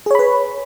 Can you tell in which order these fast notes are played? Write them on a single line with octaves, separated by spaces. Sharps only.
G#4 C#5 B5 B4